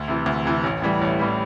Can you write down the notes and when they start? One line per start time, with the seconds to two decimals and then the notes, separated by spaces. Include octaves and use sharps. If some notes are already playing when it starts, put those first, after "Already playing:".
Already playing: D2
0.08 C3 E3
0.26 D2
0.45 C3 E3
0.63 A1
0.82 A2 E3 G3
1.01 A1
1.19 A2 E3 G3